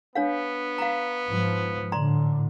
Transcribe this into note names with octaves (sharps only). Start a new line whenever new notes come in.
B3 D4 C#5 F5
F5 A#5
G#2 F3
A2 D3 D5 A#5 C6